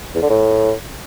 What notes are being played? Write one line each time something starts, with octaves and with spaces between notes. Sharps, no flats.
E2
D3
A2